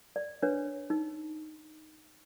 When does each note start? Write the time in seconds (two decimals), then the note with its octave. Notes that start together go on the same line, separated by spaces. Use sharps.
0.16 D5
0.42 D4 B4 C#5
0.90 D#4